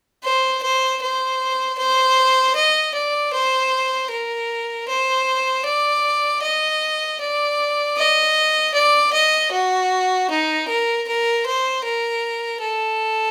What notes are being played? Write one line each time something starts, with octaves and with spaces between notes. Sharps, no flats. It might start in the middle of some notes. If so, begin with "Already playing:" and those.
C5
C5
C5
C5
D#5
D5
C5
A#4
C5
D5
D#5
D5
D#5
D5
D#5
F#4
D#4
A#4
A#4
C5
A#4
A4